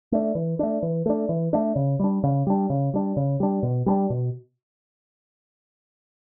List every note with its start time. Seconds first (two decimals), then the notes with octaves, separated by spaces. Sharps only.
0.12 A3 D4
0.35 E3
0.59 A3 D4
0.83 E3
1.06 A3 D4
1.29 E3
1.53 A3 D4
1.76 C#3
1.99 G3 D4
2.23 C#3
2.47 G3 D4
2.70 C#3
2.94 G3 D4
3.17 C#3
3.40 G3 D4
3.63 B2
3.86 G3 B3 D4
4.10 B2